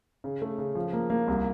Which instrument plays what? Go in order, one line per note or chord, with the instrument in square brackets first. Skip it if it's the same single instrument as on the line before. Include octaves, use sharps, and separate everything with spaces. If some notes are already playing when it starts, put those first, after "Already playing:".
[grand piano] C#3
A3
C#3
F3
A#3
A#3
C2